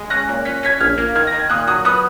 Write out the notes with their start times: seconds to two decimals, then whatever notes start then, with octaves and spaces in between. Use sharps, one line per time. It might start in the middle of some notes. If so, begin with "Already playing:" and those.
Already playing: G#3
0.10 C#4 F#6 A#6
0.28 A#2
0.45 C#4 B6
0.63 C#4 G#6 B6
0.80 A#1 F6 G#6
0.98 A#3
1.15 D#3 F6 G#6
1.27 A#6
1.33 D#3
1.39 G#6
1.50 A#2 D#6 F#6
1.67 F#3 D#6 F#6
1.85 B3 D#6 F#6